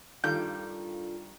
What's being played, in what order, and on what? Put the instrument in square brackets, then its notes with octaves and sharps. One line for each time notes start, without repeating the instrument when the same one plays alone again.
[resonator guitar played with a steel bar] G2 D#3 G3 [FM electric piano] D4 F4 A4 [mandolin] G6